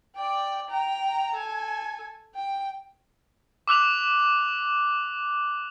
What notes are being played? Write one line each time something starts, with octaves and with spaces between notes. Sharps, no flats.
D5 G5
G5 A#5
A4 G#5
G5
D6 E6 F#6 F7